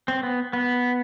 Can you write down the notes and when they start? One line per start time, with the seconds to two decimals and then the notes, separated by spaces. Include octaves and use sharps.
0.08 C4
0.23 B3
0.53 B3